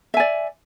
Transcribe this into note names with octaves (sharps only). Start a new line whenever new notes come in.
D5 E5 G#5